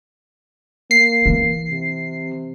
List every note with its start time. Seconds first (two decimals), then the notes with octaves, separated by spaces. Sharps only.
0.91 A#3 C7
1.26 E3
1.71 C3